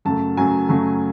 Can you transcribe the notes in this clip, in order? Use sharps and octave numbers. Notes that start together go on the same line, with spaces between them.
F#2 C#3 F#3 A3 A5
F#2 C#3 F#3 A3 G#5
F#2 C#3 F#3 A3